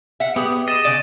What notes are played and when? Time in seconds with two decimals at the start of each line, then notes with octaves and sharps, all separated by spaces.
0.20 E5 F#5
0.36 B3 G4 G#4
0.68 D#5 A6 D#7 E7
0.85 C#3 D5 A6